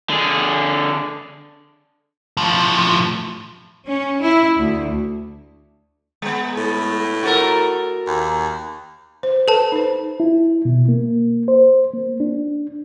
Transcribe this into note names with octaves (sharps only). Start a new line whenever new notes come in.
D3 G#4
A2 F3
C#4
E4
D2
G#3 B3
A2
F#4 A4 A#4
D#2
C5
A4 B4 A5
D#4 C5
E4
B2
A#3
C5
A#3
D4